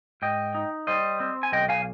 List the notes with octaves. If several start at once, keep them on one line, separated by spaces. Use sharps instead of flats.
G#2 D#5 G5
D#4
G3 C5 D#5
C4
G#5
B1 D#5 G5
F5 G#5